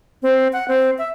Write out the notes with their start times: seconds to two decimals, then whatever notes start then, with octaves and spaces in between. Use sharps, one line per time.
0.23 C4
0.53 F#5
0.68 C4
0.98 E5